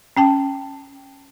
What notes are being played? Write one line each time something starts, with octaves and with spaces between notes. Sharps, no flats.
C#4 G5 A5